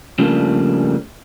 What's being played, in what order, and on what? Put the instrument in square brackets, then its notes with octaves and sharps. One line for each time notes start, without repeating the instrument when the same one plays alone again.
[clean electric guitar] C#3 F3 G3 A3 A#3 D4